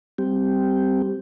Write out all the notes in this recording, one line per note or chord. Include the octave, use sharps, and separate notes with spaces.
G3 C4 G4